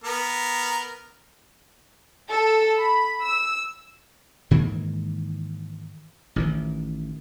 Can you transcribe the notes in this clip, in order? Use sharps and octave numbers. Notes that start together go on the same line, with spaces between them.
B3 A#4
A4
B5
E6
G#2 D#3 E3 A#3
A1 D#3 E3